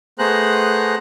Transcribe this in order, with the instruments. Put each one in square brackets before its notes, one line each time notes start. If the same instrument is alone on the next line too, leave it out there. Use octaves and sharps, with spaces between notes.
[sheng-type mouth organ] A3 B3 G#4 C5 A#5 F#6